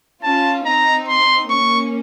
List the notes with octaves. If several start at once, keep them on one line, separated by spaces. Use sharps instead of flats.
C#4 F4 A5
C4 D#4 A#5
C6
A#3 C#4 C#6